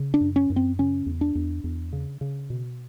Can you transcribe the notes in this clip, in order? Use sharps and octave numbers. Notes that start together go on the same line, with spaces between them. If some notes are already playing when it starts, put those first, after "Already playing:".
Already playing: C#3
D4
F#2
C#4
F#2
C4
C#3 C#4
E2
D4
E2
E2
C#3
C#3
B2